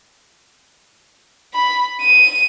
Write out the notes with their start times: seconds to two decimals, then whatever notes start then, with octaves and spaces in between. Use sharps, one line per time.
1.54 B5
2.02 D#7